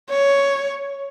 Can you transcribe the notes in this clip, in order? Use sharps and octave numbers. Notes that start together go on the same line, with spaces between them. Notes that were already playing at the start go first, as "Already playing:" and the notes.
C#5